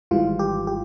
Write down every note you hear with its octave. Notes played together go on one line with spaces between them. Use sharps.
G#1 G#2 E3 G3 F4
G4
G4